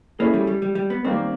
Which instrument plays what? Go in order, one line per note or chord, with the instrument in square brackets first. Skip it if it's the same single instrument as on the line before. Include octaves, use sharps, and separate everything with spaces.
[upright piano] A3 C#4 E4 G#4 [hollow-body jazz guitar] A#3
[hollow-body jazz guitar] G3
G3
G3
G3
B3
[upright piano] D#3 G3 A#3 [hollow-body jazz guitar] C4